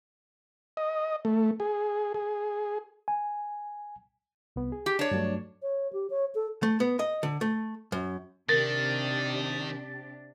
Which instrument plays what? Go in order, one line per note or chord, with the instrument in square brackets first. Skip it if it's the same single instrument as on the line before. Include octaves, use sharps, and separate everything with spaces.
[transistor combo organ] D#5
A3
G#4
G#4
[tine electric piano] G#5
[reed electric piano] C2 B3
G#4
[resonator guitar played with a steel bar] G4
D4 C#5
[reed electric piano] G2 F#3 A3
[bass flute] C#5
G4
C#5
A4
[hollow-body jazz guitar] A3
B3
D#5
D3
A3
F#2
[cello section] C3 D4 G4 [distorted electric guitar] D#3 [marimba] A#4 [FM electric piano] A6